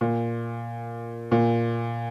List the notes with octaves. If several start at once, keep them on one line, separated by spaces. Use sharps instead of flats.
A#2
A#2